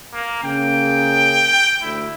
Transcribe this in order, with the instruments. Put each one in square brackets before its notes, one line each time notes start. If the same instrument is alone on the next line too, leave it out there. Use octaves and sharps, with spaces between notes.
[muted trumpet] A#3
[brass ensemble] C#3 A#3 G#4 [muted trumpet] G5
[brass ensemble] D2 [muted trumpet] E4